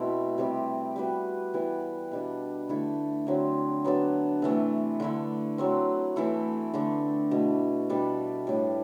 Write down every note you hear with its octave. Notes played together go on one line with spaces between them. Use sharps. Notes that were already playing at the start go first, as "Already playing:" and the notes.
Already playing: B2 A3 C4 E4
C3 G3 C4 G4
G3 B3 F#4 B4
E3 G3 B3 E4
B2 G3 D4
D3 A3 E4 A4
D3 F#3 C4
F#3 B3 D4 A4
C3 E3 A3
D3 A3 E4
F#3 A3 C4
E3 A3 E4 A4
D3 A3 D4
B2 A3 E4
B2 G3 D4 A4
A2 G3 D4 G4